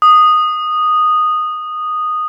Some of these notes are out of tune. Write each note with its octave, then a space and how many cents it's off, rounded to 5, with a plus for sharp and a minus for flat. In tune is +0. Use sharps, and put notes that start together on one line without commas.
D#6 -10